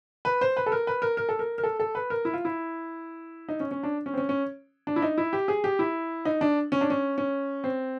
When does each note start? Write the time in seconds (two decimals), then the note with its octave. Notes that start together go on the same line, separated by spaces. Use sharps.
0.25 B4
0.41 C5
0.57 B4
0.66 A4
0.72 A#4
0.87 B4
1.02 A#4
1.17 A#4
1.29 A4
1.39 A#4
1.58 A#4
1.64 A4
1.80 A4
1.95 B4
2.10 A#4
2.25 E4
2.34 F4
2.45 E4
3.49 D#4
3.60 C#4
3.71 C#4
3.83 D4
4.06 C#4
4.14 C4
4.17 C#4
4.29 C#4
4.87 D4
4.96 E4
5.02 D#4
5.18 E4
5.33 G4
5.48 G#4
5.64 G4
5.79 E4
6.25 D#4
6.41 D4
6.72 C#4
6.81 D4
6.90 C#4
7.18 C#4
7.64 C4